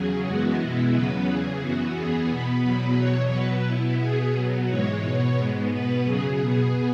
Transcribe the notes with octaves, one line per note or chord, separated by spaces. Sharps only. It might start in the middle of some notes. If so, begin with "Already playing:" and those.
Already playing: E2 C#3 F#3 G#4
F#2 E3 G#3 B3 F#4
B2 G#3 B3 E4
E2 C#3 F#3 B3 B4
E2 C#3 E3 G#4
F#2 E3 B3 F#4
E2 E3 B3 G#4
B2 B3 B4
E2 B2 F#3 B3
E2 B2 F#3 C#5
B2 F#3 B3 B4
B2 B3 E4
B2 B3 G#4
B2 F#3 B3
G#2 E3 G#3 C#5
B2 B3
G#2 G#3 B3
B2 B3 B4
F#2 C#3 F#3 G#4
B2 B3